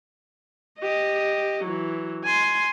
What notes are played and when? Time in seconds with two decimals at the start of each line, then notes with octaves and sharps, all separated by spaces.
0.79 G4 D#5
1.64 E3 F#3
2.24 G#5 C6